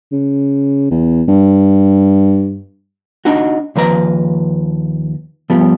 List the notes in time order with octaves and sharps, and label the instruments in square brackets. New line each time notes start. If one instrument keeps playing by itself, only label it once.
[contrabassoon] C#3
E2
G2
[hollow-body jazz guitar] D4 D#4 F#4
D#2 F3 B4 A#5
F3 G3 B3